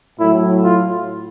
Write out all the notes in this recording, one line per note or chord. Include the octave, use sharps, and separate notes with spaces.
A2 F#3 E4
F4